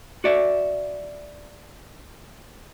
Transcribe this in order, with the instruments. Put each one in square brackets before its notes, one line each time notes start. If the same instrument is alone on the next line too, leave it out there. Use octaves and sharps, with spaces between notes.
[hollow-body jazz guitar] F#4 D5 E5